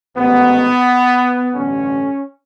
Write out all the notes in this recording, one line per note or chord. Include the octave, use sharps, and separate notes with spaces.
A1 G#2 D#3 B3
A1 G2 D3 C#4